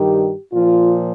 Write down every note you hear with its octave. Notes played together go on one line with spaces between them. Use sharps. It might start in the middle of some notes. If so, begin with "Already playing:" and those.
Already playing: G2 D#3 G3 G4
A#2 F3 F4